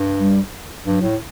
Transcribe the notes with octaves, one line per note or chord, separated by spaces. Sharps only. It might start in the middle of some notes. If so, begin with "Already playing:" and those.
Already playing: G2
G3
G2 F#3
A2